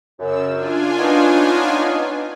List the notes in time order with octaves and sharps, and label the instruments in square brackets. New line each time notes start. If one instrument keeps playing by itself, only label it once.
[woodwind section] F#2 [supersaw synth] C#3 E6
[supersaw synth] D4 F4 G#5
[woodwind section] B3 C#4 D#4